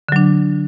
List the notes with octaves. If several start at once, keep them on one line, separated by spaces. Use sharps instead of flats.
D3 F#3 D4